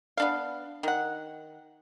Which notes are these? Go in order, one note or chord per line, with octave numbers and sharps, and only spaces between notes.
B3 D4 F5
D#3 F#5